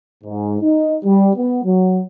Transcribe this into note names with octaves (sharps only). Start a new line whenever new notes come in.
G#2
D#4
G3
B3
F#3